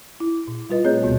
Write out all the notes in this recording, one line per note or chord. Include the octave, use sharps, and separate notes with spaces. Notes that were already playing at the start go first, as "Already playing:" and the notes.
E4
A#2
G3 F4 B4 D#5
A3 C4 G#4 C#5 D#5 G6
D2 B2 B3 F#4 D#5